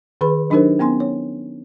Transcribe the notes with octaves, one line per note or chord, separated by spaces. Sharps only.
D#3 G#4 B4 B5
F#3 D4 D#4 G4 A#4 C5
B3 C#4 G#5 C6
C#5